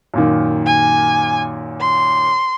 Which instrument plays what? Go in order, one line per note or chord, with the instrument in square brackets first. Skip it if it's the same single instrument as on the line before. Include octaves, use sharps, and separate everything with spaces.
[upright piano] F#2 A#2 D#3
[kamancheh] G#5
C6